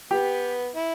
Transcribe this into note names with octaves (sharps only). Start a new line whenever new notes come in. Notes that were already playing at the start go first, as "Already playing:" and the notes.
B3 G4
E4